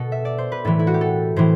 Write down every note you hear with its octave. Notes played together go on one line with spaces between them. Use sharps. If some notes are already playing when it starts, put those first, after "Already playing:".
Already playing: B2 A4
E5
D5
C5
B4
A2 E3 A4
E4
F#4
G4
A4
A2 E3 C5